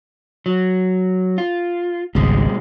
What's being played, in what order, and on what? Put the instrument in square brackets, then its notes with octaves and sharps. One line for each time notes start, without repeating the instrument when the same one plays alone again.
[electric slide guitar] F#3
F4
[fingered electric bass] G#1 C#2 [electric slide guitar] B2 G3 G#3